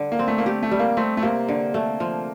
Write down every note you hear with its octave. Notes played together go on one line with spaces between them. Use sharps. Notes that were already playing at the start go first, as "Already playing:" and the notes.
Already playing: D3 G3
A#3
C4
A3
A#3
A3 G4
A3
G3
A#3
A3 C4
A3
C3 A#3
D3
A3
F3